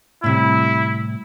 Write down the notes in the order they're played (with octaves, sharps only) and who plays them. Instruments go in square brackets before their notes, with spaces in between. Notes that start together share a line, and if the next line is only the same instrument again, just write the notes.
[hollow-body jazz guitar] A2 C3 G3 [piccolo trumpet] E4